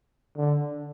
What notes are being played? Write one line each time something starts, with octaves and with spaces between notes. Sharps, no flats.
D3